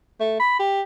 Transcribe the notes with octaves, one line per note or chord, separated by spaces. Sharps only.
A3
B5
G4